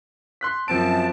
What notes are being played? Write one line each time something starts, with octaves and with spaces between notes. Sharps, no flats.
C6 F#6 B6
F#2 F3 C4 A5 D7